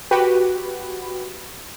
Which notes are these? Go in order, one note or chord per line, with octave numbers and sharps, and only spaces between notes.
F#4 G4 B4